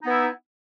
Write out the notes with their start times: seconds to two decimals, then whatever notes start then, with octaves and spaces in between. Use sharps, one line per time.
0.02 D#4
0.05 B3
0.09 E4